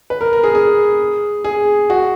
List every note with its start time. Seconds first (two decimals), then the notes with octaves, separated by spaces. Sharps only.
0.10 B4
0.21 A#4
0.33 A#4
0.44 G#4
0.55 G#4
1.44 G#4
1.90 F#4